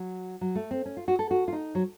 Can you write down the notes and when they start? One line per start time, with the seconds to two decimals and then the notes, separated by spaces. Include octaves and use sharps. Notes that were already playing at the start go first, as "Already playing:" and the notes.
Already playing: F#3
0.41 F#3
0.55 A3
0.71 C4
0.86 C#4
0.97 F4
1.08 F#4
1.19 A4
1.31 F#4
1.48 F4
1.53 D#4
1.75 F#3